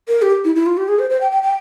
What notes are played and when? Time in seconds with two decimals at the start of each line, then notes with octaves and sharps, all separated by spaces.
0.08 A#4
0.22 G4
0.45 E4
0.56 E4
0.66 F4
0.77 G4
0.88 G#4
0.99 C5
1.10 C5
1.21 G5
1.32 G5
1.43 G5